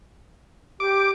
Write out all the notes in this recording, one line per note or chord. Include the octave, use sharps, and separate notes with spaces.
G4 D6